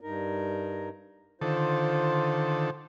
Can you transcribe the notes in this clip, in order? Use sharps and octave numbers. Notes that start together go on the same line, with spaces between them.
G2 D#4 A#4
D3 D#3 F4 A4 C5